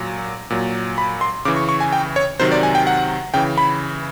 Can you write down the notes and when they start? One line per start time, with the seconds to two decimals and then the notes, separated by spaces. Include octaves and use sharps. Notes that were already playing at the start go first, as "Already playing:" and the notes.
Already playing: A#2 F#3
0.50 A#2 F#3
0.98 B5
1.21 C6
1.45 C#3 D6
1.48 E3
1.56 C#6
1.69 C#6
1.80 G#5
1.93 G5
2.16 C#5
2.39 C3 D#3 F#3 C5
2.52 D5
2.63 G#5
2.75 G5
2.87 F#5
3.34 C#3 E3 G5
3.58 B5